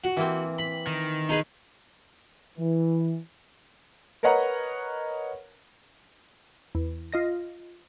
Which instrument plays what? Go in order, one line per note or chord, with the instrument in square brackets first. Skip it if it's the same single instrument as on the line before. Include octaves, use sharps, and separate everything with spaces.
[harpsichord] F#4
[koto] E3 A#3 C4
[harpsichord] B5
[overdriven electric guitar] D#3
[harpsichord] D#4 G#4 B4
[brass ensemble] E3
[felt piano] A#4 B4 C#5 D#5 F#5 A#5
[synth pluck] E2
F4 D#5 A#6